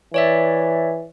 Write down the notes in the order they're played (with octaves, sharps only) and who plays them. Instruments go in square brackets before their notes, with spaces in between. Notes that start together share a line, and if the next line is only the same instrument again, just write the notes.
[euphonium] E3 [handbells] C#5 D5 E5